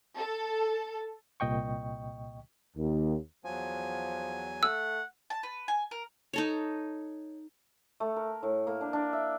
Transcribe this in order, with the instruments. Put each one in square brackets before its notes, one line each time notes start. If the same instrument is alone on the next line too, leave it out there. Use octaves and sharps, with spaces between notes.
[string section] A4
[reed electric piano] C2 A#2 D#5 G5 C#6
[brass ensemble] D#2
[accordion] E2 F#3 G#5 [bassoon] F3
[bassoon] A3 [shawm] F#5 [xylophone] E6
[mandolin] A5
B4
G#5
A#4
[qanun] D#4 A4 C#5
[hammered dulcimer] A3
A#4
A2
A#3
D4
D4
E5